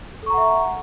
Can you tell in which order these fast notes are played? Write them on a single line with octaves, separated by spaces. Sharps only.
A4 C#6 A#5 F#5 E5